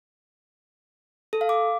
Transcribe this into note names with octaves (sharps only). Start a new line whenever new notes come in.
A4
F5
D6